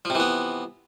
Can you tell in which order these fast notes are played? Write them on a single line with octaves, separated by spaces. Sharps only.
F3 C3 E3 B3